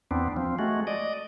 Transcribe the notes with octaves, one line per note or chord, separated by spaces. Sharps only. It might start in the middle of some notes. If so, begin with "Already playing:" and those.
E2 B3 C4 D4
F3 C4
G#3 A3 F#4
D5 D#5